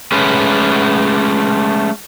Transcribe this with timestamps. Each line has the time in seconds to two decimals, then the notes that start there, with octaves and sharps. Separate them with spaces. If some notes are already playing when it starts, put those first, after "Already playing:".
0.12 G#3 A3 C#4 B4